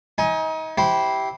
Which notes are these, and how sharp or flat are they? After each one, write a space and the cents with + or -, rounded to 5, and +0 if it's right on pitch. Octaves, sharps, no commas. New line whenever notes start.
D#4 +35 G#5 +0
E4 -15 G4 -15 C5 +0